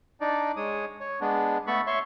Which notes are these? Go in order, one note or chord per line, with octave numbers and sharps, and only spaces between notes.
D4 D#4 D5
G#3 C#5 D#6
C#5
G#3 B3 D4
A3 B3 A4 B5 C#6
C#5 E5 C6 C#6